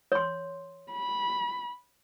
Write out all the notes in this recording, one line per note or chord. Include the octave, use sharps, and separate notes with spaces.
C#5 C6
B5